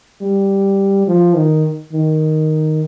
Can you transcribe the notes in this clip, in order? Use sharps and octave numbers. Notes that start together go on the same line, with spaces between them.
G3
F3
D#3
D#3